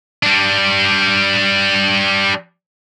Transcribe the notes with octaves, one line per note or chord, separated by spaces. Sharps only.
G3 D4